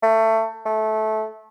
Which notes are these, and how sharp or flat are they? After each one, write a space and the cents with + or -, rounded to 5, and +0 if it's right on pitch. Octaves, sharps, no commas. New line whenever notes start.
A3 +20
A3 -15